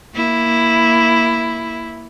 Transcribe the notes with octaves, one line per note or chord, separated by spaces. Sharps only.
A#3 E4